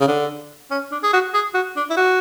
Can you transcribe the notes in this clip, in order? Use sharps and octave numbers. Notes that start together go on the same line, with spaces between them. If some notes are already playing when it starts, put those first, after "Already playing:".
C#3
D3
C#4
D4
G#4
F#4
G#4
F#4
D4
E4
F#4